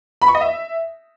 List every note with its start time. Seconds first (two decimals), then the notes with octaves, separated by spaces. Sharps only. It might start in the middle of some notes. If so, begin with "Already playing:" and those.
0.22 B5
0.28 C#6
0.35 D#5
0.41 E5